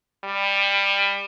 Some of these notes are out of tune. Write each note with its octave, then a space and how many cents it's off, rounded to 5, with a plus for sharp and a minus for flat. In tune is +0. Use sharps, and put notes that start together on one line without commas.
G3 +20